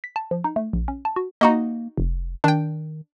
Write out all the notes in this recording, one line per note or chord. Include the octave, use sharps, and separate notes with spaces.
B6
A5
F3
D#4
A3
A#1
C#4
A5
F#4
A#3 D#4 F#4 D#5
F1
D#3 D4 G5